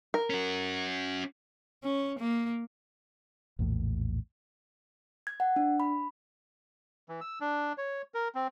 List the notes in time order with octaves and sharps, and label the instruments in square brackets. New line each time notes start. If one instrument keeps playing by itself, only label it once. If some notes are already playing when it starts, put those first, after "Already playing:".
[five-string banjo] A#4
[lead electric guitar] C#4 F#4
[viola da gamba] C#4
A#3
[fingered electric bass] A#1 E2 A2
[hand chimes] G#6
F#5
D4
B5
[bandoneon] E3
E6
D4
C#5
A#4
C4